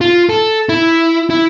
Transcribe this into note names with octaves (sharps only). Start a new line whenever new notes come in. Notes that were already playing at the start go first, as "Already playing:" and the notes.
F4
A4
E4
E4